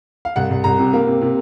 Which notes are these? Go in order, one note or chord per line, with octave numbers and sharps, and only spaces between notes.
F5
C2 F#5
C2
C2 A#5
C3
A#3
C3
C3